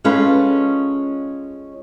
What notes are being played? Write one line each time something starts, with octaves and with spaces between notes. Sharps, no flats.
G#3 C#4 F4 A4 B4